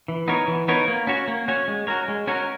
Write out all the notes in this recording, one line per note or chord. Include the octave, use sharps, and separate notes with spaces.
E3
B3 D#4 A#4 C#5
E3
B3 D#4 A#4 C#5
A#3
C#4 F#4 C#5
A#3
C#4 F#4 C#5
G#3
C#4 F#4 A#4 C#5
G#3
C#4 F#4 A#4 C#5